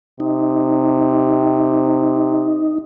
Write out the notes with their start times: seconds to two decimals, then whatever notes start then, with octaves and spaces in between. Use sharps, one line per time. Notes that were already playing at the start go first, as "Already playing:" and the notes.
0.20 C3 D#4